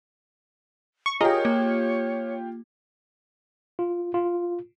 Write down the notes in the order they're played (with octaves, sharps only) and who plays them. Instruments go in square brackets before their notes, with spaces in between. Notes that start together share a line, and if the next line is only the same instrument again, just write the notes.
[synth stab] C#6
[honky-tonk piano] F4 G4 [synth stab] G#4 A#4 D#5 [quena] C#5
[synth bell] A#3
[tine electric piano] F4
F4